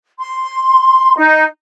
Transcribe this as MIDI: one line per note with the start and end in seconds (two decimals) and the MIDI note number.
0.18 1.12 84
1.15 1.42 63